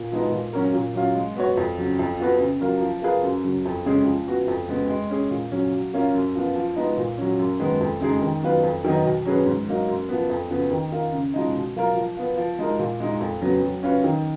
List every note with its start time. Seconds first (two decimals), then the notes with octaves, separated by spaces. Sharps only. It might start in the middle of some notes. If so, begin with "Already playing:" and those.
Already playing: A#2
0.12 F3 G#3 B3 D#4
0.32 A#2
0.53 F#3 C#4 F#4 A#4
0.74 A#2
0.94 F#3 C#4 F4
1.15 G#3
1.36 B3 F#4 C#5
1.57 F2
1.78 C#3 F#3
1.99 F2
2.20 F3 B3 F#4 B4
2.40 C#3
2.61 F#3 A#3 F4 A#4
2.81 F3
3.02 A#3 F4 G#4 B4
3.23 F#2
3.44 C#3 F#3
3.65 F2
3.85 C#3 G#3 C#4 G#4
4.06 F3
4.27 B3 F#4
4.48 F2
4.69 C#3 G#3 B3
4.90 G#3
5.10 C#4 G#4
5.31 A#2
5.52 F#3 C#4
5.73 F#3
5.94 A#3 C#4 F4
6.14 F#2
6.35 F3 B3 F4
6.56 F3
6.76 G#3 B3 D#4
6.98 A#2
7.18 F#3 C#4
7.38 F#2
7.60 D#3 G#3 B3
7.81 F2
8.01 C#3 G#3 D#4 G#4
8.22 D#3
8.43 F#3 B3 F4 B4
8.63 F2
8.85 D#3 F#3 B3 D#4
9.05 B2
9.26 F#3 C#4 G#4 B4
9.46 G#2
9.68 F#3 A#3 D#4
9.88 F#2
10.09 F3 B3
10.30 F2
10.51 C#3 F3 B3
10.71 D#3
10.92 A#3 F4
11.13 C#3
11.34 F3 G#3 D#4
11.54 B2
11.75 F#3 A#3 F4 A#4
11.96 F3
12.17 B3 F4
12.37 F3
12.59 G#3 D#4 A#4
12.80 A#2
13.00 G#3 D#4
13.20 F2
13.42 C#3 F#3 B3
13.62 F#3
13.83 C#4 F4 B4
14.04 D#3